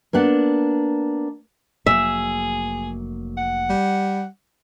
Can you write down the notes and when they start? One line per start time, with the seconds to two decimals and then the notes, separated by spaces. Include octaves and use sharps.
0.13 A#3 B3 D4 F#5
1.86 F1 F#3 A#3 G#4 E5
3.37 F#5
3.70 G3